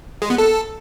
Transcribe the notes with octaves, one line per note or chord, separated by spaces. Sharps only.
G#3
B3
A4